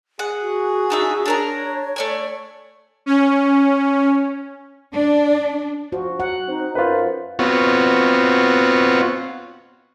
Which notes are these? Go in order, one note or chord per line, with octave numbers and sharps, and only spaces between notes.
G#4 F#5
F#4
D4 D#4 E5
D4 A#4 C#5 A#5
A3 D5 G#5
C#4
D4
F3 F#4
F#3 F#5
C4 D#4
F#2 F4 B4 C5
B3 C4 F4 F#4 C#5